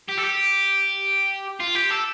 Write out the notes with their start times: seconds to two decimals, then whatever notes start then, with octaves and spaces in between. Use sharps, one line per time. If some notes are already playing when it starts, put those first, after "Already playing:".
0.08 G4
0.17 A4
0.23 G4
1.60 F4
1.75 G4
1.91 A4